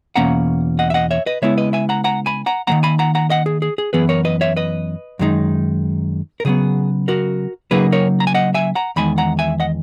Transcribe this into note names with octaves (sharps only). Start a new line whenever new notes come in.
E2 B2 A#3 C#4 F#5 A#5
D#5 F#5
E5
D#5 F#5
C#5 E5
B4 D#5
C#3 G#3 B3 E4 C#5 E5
B4 D#5
E5 G#5
F#5 A#5
F#5 A#5
G#5 B5
F#5 A#5
D#3 F#3 A#3 F#5 A#5
G#5 B5
F#5 A#5
F#5 A#5
D#5 F#5
G#4
G#4
G#4
F#2 E3 B3 G#4 B4
A#4 C#5
B4 D#5
C#5 E5
B4 D#5
F#2 D#3 G#3 D#4
A#4
C#3 F#3 B3 G#4
F#4 A#4
C#3 F#3 A#3 D#4 G#4 B4
A#4 C#5
A#5
G#5
D#5 F#5
E5 G#5
F#5 A#5
E2 D#3 G#3 G#5 B5
F#5 A#5
E5 G#5
D#5 F#5